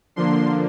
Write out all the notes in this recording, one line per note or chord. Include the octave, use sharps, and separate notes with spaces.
D3 F3 A#3 D4 C6